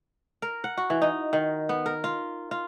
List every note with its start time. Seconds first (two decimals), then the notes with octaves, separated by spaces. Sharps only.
0.42 A#4
0.64 F#5
0.77 F#4
0.90 E3
1.02 D#4
1.33 D#3
1.69 B3
1.86 A#4
2.04 F4
2.51 F4